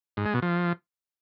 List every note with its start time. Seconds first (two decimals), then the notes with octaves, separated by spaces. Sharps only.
0.17 G#2
0.26 G#3
0.34 B2
0.42 F3